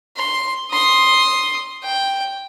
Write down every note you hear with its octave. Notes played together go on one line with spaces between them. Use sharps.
C6
C6 D#6
G5